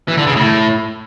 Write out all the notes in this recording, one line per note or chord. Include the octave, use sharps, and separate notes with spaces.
E3
D3
C#3
A2